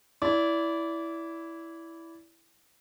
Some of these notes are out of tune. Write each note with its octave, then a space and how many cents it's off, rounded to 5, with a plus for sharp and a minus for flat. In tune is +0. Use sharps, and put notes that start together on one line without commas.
E4 +0 D5 -25